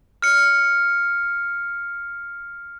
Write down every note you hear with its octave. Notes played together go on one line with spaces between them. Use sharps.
F6 C#7